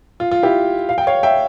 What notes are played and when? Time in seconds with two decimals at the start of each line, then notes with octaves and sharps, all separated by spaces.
0.20 F4
0.31 F4
0.43 E4 G4
0.89 F5
0.98 G5
1.07 C#5 F5
1.23 E5 G5